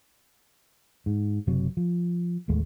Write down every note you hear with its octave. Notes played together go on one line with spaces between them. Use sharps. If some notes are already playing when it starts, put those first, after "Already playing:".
G#2
F#1 C3 F#3
F3
A1 D#2 G#3 A3